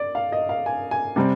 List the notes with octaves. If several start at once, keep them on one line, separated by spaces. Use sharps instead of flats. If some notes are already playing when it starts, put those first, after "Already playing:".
Already playing: D5
F5
D#5
F5
G#5
G#5
C3 G3 C4